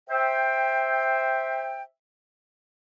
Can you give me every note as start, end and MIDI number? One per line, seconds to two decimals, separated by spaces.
0.10 1.83 72
0.10 1.83 76
0.10 1.83 79